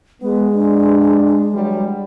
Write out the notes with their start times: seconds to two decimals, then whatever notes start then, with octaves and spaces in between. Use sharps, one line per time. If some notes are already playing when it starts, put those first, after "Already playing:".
0.22 G#3 B3
0.55 D4
1.54 E3 F#3 G3